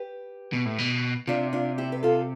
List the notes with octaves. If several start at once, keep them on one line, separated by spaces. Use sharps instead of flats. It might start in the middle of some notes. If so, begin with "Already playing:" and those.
Already playing: G4 B4
B2
A2
B2
C3 D4 F4
D4 F4
E4 G4
B4
F4 A4